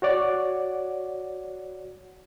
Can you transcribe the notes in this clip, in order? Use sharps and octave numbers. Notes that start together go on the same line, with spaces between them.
F#4 C#5 D5 F#5